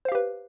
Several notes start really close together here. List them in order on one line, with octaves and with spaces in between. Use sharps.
C5 F5 G4 B4